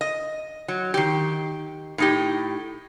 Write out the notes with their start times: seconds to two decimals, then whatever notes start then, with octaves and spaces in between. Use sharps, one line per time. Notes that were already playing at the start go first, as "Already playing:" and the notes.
0.01 D#5
0.68 F#3
0.94 D#3 G4
1.98 A2 D#4 G4